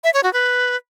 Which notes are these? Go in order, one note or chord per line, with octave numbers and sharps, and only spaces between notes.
E5
C#5
F#4
B4